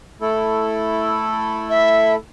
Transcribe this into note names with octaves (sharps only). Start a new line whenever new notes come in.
A3 E4 A4
E5